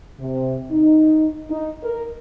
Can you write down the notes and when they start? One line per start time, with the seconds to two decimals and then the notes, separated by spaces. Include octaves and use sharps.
0.20 C3
0.72 D#4
1.50 D#4
1.83 A#4